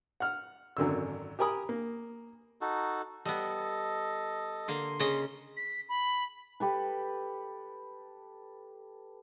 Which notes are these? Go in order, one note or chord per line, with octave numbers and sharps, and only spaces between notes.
F#5 F6
G#1 F#2 D3 E6
G4 A#4 G#5 B5 D#6
A#3
D#4 F#4 A4
G3 B3 A4 D#5
D3 A#3 C6
C#3 C#4 D#5
B6
B5
G4 A4 B4